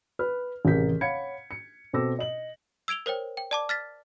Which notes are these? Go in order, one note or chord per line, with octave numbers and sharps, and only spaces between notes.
B4 F6
A1 C3 G#4 A#4 G6 B6
C#5 F5 F#5 B5 G#6 C#7
C#7
B2 C4 A4 D6 E6 A#6
D#5 F#7
E6 G#6 D7 F7 G7
A#4 C5 C#5 G5
G5
D5 A5 D6
F6 A6 B6